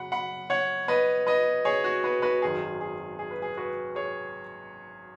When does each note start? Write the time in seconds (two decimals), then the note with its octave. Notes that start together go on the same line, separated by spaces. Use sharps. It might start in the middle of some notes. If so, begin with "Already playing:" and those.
Already playing: F#2 C#3 F#3 F#5 B5
0.12 F#5 B5
0.50 C#5 F#5
0.88 B4 D#5
1.27 B4 D#5
1.65 G#4 C#5
1.84 F#4
2.04 F#4 B4
2.22 F#4 B4
2.42 G#1 F#2 D#3 G#4
2.81 G#4
3.19 G#4
3.31 B4
3.42 G#4
3.57 F#4 B4
3.95 G#4 C#5